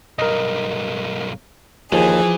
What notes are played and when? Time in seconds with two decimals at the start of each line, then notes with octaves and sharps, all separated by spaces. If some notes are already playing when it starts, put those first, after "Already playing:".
0.19 B1 G2 A#4 D#5
1.92 D#2 E3 F3 G#4